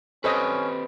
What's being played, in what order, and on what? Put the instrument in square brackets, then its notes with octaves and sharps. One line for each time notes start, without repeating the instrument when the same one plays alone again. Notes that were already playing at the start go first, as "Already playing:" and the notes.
[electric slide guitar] C4 G4 B4 [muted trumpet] C#4 [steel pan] A4 C5 D#5